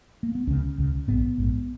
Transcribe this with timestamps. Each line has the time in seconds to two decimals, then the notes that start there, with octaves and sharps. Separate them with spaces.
0.23 A#3
0.35 B3
0.47 C#2 C#3 C#4
0.78 C#2 C#3
1.08 A#1 G#2 B3
1.38 A#1 G#2